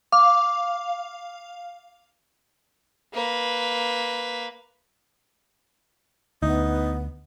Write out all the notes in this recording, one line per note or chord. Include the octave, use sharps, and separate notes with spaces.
F5 D6
A#3 B4
D2 B3 D#4